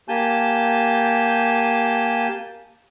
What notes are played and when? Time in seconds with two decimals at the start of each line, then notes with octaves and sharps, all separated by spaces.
0.08 A#3 G4 G#5 A5 G6